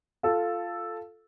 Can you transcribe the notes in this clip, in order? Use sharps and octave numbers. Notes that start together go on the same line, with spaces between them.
F4 A4